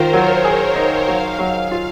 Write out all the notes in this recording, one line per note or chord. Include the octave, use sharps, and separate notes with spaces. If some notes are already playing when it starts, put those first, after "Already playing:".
Already playing: D#3 F4 A#4 C5
F#3 C#5
G#4
C#5
D#4
F#3 F5
F#3
F5
F4